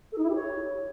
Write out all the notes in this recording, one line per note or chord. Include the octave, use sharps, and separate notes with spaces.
A4
D#4
E4
G4
C#5